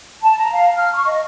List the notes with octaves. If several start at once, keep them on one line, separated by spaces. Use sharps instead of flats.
A5
A#5
F5
F6
C#6
D#5